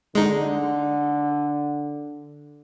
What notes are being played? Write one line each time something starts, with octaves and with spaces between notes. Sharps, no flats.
D3 G#3 D#4